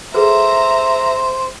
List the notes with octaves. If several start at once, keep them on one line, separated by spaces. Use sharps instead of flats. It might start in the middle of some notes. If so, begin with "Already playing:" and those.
G#4 A4 B4 C5 E5 A#5